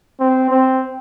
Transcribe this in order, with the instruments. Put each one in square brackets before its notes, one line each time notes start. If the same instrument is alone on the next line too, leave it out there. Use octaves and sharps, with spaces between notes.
[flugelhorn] C4
C4